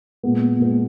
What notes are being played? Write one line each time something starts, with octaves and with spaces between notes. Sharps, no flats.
A#2 G#3 B3
A#2 G#3 B3